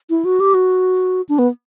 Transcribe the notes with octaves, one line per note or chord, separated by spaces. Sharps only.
E4
F#4
G4
F#4
D4
B3